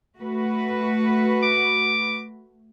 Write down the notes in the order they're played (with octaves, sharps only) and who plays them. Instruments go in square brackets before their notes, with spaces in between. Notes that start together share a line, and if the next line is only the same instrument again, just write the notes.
[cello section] A3 F#4 B4
[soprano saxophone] D6